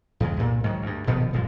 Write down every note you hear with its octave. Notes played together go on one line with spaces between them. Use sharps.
E2 C#3 G#3
C2 G2 A#2
G#2 D#3 F#3
D2 G2
D#1 B2 D#3 F3
D#1 F#2 A#2 G#3